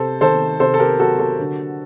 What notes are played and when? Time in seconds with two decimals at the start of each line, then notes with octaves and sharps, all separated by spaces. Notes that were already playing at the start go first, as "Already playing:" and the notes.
Already playing: C3 A4 C5
0.21 D#3 A4 C5
0.60 C3 A4 C5
0.74 A4
0.80 G4 A#4
0.99 F#3 F#4 A4
1.19 F#4 A4
1.39 D3